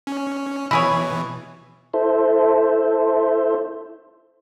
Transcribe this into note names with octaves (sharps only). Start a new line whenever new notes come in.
C#4
B2 E3 E4 G#4 C#5
E4 A4 C5